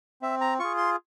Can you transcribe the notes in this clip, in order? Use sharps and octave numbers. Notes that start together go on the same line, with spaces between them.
C4 E5
A#5
F4 G#4 C#6
C6